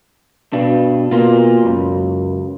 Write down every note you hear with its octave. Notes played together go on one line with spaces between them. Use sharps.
G2 B2 D4
B2 A#3 F4
C#2 F#2